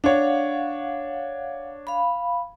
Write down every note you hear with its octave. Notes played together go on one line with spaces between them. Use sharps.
D4 C#5 F5 F#5
F5 B5